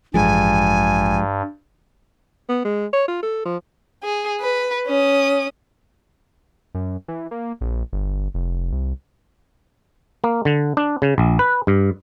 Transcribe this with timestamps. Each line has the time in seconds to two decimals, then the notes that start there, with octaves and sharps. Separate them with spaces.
0.14 A1 G2 F3 G#3 G#5
2.49 B3
2.65 G#3
2.93 C#5
3.08 F4
3.22 A4
3.45 F3
4.03 G#4
4.40 B4
4.87 C#4 D#6
6.75 F#2
7.08 E3
7.31 A#3
7.61 A#1
7.93 G1
8.34 F1
8.72 C2
10.24 A#3
10.45 D3
10.77 D4
11.02 C#3
11.18 A#1
11.39 B4
11.67 G2